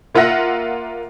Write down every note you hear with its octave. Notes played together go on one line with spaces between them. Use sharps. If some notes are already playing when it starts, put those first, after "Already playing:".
A#3 F4 E5 F#5 A#6